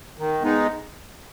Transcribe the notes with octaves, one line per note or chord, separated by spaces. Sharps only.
D#3
G#3 B3 D#4